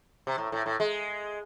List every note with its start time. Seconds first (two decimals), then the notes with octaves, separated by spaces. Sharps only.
0.27 C3
0.38 A2
0.52 A2
0.66 A2
0.80 G#3